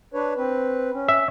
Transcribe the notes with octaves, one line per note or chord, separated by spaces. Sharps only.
D4 B4 C#5
C4 B4
C#4
E5